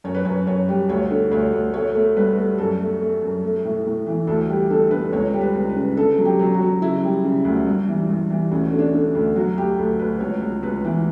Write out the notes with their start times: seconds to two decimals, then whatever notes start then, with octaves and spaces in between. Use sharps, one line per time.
0.04 F#2 C#5
0.15 B4
0.25 F#2 C#5
0.46 F#2 C#5
0.69 G3
0.89 D2 C#5
1.10 D3
1.31 D2 C#5
1.53 D2
1.74 A3 C#5
1.95 A3
2.17 G2 B4
2.37 A3
2.58 F#2 A4
2.80 A3
3.01 A3
3.22 F#2
3.44 A3
3.64 A2
3.85 A2
4.07 E3
4.27 D2 A4
4.49 G3 G4
4.70 D3 A4
4.91 D3 B4
5.13 C#2 C#5
5.33 G3
5.41 B4
5.55 C#2
5.69 B4
5.76 C#3
5.97 D3 A4
6.18 F#3
6.25 G4
6.39 F#3
6.54 F#4
6.61 F#3
6.82 C#3 E4
7.04 G3
7.24 C#3
7.45 D2
7.67 G2
7.88 E3
8.09 G2
8.30 E3
8.51 D2 C#4
8.72 D3 C#4
8.79 D4
8.94 D3
9.15 D2
9.35 F#3 F#4
9.57 D2 G4
9.78 D2 A4
9.99 D2 B4
10.20 C#2 C#5
10.41 C#2
10.63 C#2 B4
10.85 E3